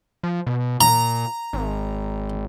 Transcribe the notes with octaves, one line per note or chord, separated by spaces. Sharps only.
F3
B2
A#2 A#5
G#1